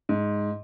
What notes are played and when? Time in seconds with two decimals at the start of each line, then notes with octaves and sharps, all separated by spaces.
0.09 G#2